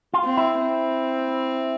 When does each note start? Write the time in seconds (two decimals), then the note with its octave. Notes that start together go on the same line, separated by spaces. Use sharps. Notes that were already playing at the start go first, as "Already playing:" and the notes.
0.14 F4
0.25 C4
0.37 E4
0.61 C4